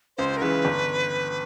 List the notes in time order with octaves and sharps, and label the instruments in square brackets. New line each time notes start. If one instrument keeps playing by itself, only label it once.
[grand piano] C#2 [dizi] C5
[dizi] A#4
[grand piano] C#3 E3 [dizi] B4
[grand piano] G1